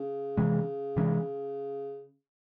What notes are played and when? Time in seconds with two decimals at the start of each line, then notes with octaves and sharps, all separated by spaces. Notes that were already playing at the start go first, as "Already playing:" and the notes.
Already playing: C#3
0.37 C3 E3 G#3 C#4
0.96 C3 E3 G#3 C#4